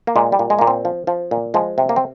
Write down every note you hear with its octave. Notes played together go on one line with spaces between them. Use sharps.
A#3
A#2 G#3
G3
A#2
G#3
A#2 A#3
C4
F3
F3
A#2
F3 G#3
C3
A#3
C4